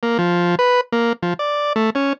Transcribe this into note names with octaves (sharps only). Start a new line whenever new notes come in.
A#3
F3
B4
A#3
F3
D5
A3
C#4